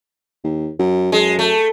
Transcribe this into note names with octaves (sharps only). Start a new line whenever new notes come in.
D#2
F#2
F#2 G#3
A3